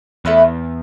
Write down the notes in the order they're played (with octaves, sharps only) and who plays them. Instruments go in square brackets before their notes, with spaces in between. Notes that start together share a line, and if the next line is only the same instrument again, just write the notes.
[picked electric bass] E2 [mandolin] A3 E4 B4